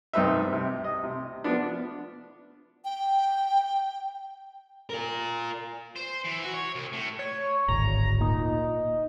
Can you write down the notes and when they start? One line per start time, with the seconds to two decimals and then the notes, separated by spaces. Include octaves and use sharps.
0.13 C2 G2 D#4 B4 C5 E5
0.52 C3
0.84 D#5
1.03 C3
1.44 F3 B3 D4
2.85 G5
4.90 F4 A#4
5.96 C5
6.25 E3
6.43 F#4
6.54 C#5
6.75 C2
6.92 A2
7.19 C#5
7.68 D1 G#1 D2 A#5
8.21 A#2 D#4